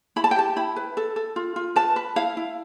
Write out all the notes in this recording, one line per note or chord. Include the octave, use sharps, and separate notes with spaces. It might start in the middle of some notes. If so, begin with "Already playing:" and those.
E4 B5
A5
G5
G4 A5
E4 B5
B4
A4
A4
F4
F4
B4 A5
B4
E4 F5
E4